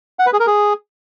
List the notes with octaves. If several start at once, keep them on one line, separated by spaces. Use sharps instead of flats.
F#5
B4
G#4
A#4
G#4